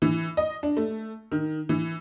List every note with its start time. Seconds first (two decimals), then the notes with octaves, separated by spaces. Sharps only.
0.02 E3
0.37 D#5
0.63 D4
0.77 A3
1.32 D#3
1.69 E3